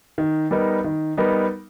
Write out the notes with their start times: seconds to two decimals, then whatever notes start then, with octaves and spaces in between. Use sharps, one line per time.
0.18 D#3
0.51 G3 B3 D#4 A#4
0.84 D#3
1.17 G3 B3 D#4 A#4